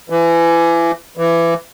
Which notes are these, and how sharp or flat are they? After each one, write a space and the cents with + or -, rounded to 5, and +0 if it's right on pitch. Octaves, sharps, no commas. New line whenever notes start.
E3 +30
E3 +25